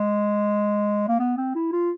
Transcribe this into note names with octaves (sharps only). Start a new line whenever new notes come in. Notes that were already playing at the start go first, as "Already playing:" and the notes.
Already playing: G#3
A#3
B3
C4
E4
F4